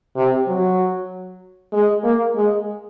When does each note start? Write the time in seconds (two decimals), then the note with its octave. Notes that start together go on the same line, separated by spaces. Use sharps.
0.16 C3
0.48 F#3
1.73 G#3
2.04 A#3
2.36 G#3